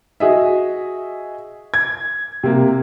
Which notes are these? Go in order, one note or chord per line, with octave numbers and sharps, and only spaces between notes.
F#4 G#4 D#5 E5
G#6
C3 A#3